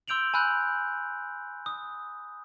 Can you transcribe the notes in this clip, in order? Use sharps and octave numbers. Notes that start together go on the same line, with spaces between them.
C6 E6 G6 D7 F7 F#7
G#5 B5 E6 F#6 G6
D#6